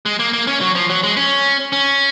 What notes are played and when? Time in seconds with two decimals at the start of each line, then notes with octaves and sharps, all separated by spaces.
0.06 G#3
0.19 A#3
0.33 A#3
0.47 C#4
0.61 F#3
0.75 F3
0.90 F#3
1.03 G#3
1.17 C#4
1.72 C#4